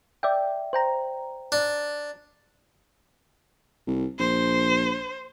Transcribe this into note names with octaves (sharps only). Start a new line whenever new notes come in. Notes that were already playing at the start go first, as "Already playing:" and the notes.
D5 E5 G5
C5 G5 A#5
D4
C2
A#1 C5